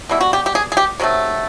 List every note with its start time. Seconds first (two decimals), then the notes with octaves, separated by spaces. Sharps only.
0.09 B2 G3 B3 E4
0.21 F#4
0.33 G4
0.46 G4
0.55 G#4
0.72 G#4
0.77 G4
1.00 C3 D#3 F#3 A3